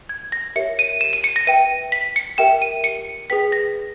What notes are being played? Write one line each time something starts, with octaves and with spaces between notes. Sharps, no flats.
G#6
A#6
G4 A#4 C#5 E5 C#7
D#7
E7
D#7
C#7
A#6
B4 E5 G5 D#7
B6
C#7
G4 A#4 E5 G5 E7
D#7
C#7
G#4 B4 G5 B6
A#6